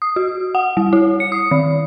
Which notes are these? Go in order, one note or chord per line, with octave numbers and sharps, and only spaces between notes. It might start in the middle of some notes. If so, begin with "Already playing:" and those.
D#6
F#4
F#5
G3
E4
C#7
D#6
D#3